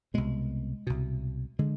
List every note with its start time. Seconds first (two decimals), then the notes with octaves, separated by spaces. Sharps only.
0.14 C2 B2 G#3
0.87 C2 B2
1.59 D3 G#3